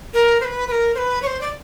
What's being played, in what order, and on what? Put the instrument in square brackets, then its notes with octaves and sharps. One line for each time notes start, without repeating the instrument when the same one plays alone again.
[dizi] A#4
C5
B4
B4
A#4
C5
B4
C#5
C5
D5